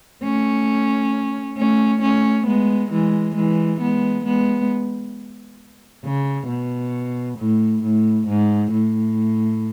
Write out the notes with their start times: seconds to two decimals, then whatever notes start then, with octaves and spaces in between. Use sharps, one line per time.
0.23 A3 C#4
1.57 A3 C#4
2.02 A3 C#4
2.46 G#3 B3
2.92 E3 G#3
3.35 E3 G#3
3.81 G#3 B3
4.25 G#3 B3
6.04 C#3
6.48 B2
7.38 A2
7.83 A2
8.28 G#2
8.72 A2